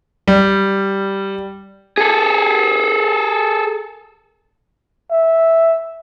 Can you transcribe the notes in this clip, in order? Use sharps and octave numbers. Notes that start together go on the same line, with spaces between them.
G3
G#4 A4
E5